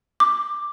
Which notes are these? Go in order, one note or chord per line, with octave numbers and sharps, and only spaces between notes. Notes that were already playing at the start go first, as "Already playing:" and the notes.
D6